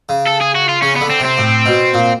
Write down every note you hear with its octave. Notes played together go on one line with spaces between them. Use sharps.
C#3
A4
G#4
F#4
F4
C#3 C#4
D3 B3
C4
C3
C4
A2
B2
A#2